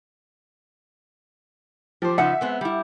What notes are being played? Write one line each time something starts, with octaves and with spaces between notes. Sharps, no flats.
F3 G4 C5
C#3 F3 D#4 E5 F#5
G#3 B3 C4
G3 E4